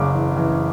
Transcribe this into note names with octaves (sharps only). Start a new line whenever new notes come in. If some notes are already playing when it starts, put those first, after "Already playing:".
Already playing: F#1 C#3 D6
E3
E3